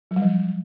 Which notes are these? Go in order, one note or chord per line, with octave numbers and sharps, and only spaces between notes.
F#3
G3
F3